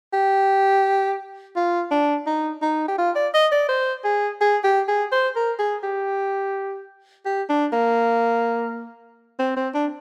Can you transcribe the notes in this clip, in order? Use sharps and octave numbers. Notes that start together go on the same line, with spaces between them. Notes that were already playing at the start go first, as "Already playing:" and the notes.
G4
F4
D4
D#4
D#4
G4
F4
D5
D#5
D5
C5
G#4
G#4
G4
G#4
C5
A#4
G#4
G4
G4
D4
A#3
C4
C4
D4